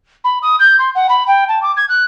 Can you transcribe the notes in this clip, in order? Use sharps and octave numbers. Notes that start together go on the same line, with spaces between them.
B5
D#6
G6
C6
F#5
B5
G5
A5
D6
G#6
F#6